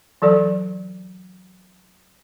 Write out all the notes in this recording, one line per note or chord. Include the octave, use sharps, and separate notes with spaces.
E3 F#3 A4 D5